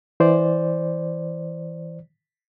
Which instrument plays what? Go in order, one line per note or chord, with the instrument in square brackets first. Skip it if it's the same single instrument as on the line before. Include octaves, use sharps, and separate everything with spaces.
[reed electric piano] E3 C5 D5